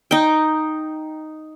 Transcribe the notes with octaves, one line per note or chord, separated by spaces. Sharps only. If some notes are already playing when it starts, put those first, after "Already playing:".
D#4 G5